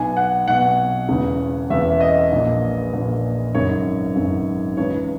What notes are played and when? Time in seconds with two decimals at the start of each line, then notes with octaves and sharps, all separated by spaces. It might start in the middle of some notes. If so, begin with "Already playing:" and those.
Already playing: B1 B2 G#5
0.17 F#5
0.47 B1 B2 F#5
1.09 E1 E2 C#3
1.70 E1 E2 C#3 E5
2.01 D#5
2.32 A#1 A#2
2.93 A#1 A#2
3.54 G#1 F#2 C#3 C#5
4.16 G#1 F#2 C#3
4.77 C#2 C#3 E3 C#5